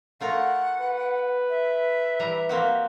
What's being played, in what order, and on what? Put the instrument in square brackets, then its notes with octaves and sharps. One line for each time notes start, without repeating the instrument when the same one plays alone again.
[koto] A3 F4 A#4 [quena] F#5
[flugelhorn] B4
[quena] E5
[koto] E3 G3 A#5
A#3 C4 F#4